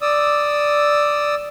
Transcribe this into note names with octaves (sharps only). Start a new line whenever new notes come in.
D5 D#6 E6